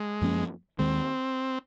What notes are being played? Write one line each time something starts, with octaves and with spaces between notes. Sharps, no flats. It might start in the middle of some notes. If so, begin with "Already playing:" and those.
Already playing: G#3
F#2 F3 A#3 C#4
D#2 D#3 G#3 C4